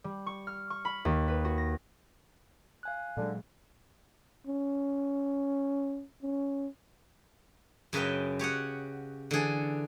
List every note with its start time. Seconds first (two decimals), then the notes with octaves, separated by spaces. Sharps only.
0.04 G3
0.26 C#6
0.47 F6
0.70 C#6
0.85 B5
1.05 D#2
1.28 B4
1.45 F#4
1.58 A#6
2.83 F5 G#5 F#6
3.17 A#2 D3 F#3 G#3
4.47 C#4
6.23 C#4
7.93 F#2 C#3 B4 D#5 G5
8.39 G4 C#5 D#5 F#5
9.31 D3 E3 G#4 A4